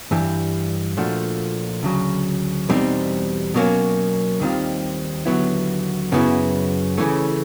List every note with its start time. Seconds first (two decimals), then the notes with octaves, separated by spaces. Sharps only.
0.11 G2 E3 G3
0.97 A#2 F3 A3 D4 F#4
1.83 D2 C#3 F#3
2.69 E2 B2 G3 C4 D#4
3.54 B2 F#3 A#3 C#4
4.40 D#2 D#3 G3 C4 F4
5.26 D#2 D3 F#3 B3 E4
6.12 F#2 C#3 F#3 B3 E4
6.97 C#3 E3 A3 C#4